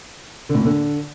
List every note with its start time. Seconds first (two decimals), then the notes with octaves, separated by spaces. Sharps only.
0.49 D3
0.54 A2
0.60 A#2
0.65 D3